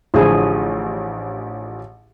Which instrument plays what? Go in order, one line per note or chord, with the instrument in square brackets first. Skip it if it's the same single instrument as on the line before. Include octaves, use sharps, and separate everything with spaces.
[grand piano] A1 D3 F3 [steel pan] E4 G#4